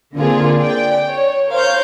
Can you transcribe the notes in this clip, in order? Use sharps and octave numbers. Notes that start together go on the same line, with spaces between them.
D3 A#3 C4 F4 G#4
D5 G5
C#5
A#4 C5 C#5 F5 G6